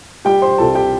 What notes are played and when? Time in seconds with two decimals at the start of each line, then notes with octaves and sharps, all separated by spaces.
0.25 G3 G4 G5
0.42 C5 C6
0.58 C2 A4 A5
0.75 G4 G5